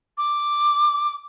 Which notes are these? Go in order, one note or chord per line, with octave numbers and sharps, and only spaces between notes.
D6